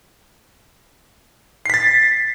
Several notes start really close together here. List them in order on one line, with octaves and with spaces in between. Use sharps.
C7 B6 A6